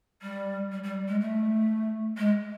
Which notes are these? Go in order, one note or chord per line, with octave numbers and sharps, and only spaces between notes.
G3
G3
G3
G#3
A3
G#3